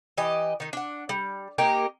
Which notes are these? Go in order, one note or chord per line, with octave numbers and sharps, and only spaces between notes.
E3 G4 D#5
D#3 D#4
D4 F#5
G3
A#3 D#4 G4 A#4